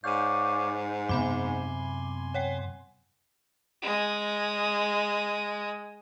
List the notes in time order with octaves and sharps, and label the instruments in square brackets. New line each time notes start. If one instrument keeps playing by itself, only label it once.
[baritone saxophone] G#2 [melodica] C#5 D5 F5 [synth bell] G6 D#7
[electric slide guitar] F#2 C3 [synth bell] B3 B5 D6 [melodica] G#5 C6
[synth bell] C#5 F#5 G5
[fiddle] G#3 D#6